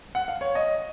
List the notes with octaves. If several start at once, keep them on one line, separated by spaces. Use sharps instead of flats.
F#5
F5
C#5
D#5